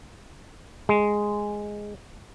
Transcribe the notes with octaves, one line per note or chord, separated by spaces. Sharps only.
G#3